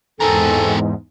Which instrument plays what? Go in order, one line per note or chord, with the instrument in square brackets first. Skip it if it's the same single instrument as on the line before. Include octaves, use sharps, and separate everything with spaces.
[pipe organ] E2 G#2 [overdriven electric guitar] C4 A#4 [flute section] A4 G#5